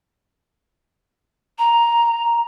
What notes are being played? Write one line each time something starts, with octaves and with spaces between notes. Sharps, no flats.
A#5